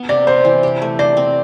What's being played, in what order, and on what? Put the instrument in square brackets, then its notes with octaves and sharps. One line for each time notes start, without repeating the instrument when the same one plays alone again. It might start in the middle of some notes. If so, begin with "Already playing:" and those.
Already playing: [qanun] B3
[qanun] C3 [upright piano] D5
[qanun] C3 [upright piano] C5
[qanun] E3
G4
A3
[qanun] C5 [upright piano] D5
[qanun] C4